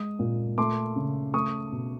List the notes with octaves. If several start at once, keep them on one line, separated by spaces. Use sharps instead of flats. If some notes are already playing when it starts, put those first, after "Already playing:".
Already playing: G#3 D#6
A#2
A3 C6 D6
C#3
A3 C#6 D#6
B2